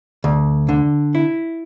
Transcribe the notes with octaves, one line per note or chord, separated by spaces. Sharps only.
D2
D3
E4